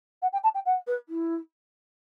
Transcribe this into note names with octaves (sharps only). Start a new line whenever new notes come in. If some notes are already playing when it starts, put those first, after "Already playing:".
F#5
G5
A5
G5
F#5
B4
E4